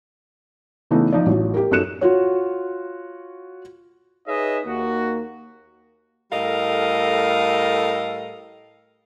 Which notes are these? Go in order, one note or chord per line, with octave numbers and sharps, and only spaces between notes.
C#3 E3 A3 B3 D#4
F3 D#4 D5
A1 F#3
G4 A#4
F#2 D#4 A4 F#6 C#7 E7
F4 F#4 C#5
D#4 G#4 B4 C#5 D#5 E5
D#2 A#3 F#4
A2 G3 A4 A#4 D#5 F5